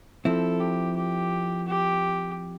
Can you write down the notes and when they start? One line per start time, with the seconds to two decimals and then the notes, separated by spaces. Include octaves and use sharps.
0.25 F3 C4 E4 A4
0.60 G4
0.96 G4
1.67 G4